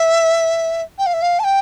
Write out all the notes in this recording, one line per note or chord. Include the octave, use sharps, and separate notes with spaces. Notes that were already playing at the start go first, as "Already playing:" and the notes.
Already playing: E5
G5
F5
E5
F5
A5
G5